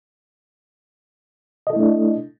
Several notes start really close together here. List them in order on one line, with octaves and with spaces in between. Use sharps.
D#5 A4 E4 A3 D4